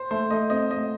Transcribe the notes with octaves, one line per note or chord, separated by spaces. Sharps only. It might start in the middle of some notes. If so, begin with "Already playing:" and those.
Already playing: C5
A3 C5
A3 D#5
C4 D#5
A3 D#5